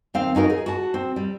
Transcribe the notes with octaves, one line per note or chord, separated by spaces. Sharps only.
D#2 C4 F5
C#4 D#4 F#4 A#4
G#4 A#4
F#4 A5
C4
G3